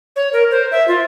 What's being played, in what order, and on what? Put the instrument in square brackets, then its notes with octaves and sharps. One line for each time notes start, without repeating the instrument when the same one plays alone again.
[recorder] C#5
A#4
C5
E5
F4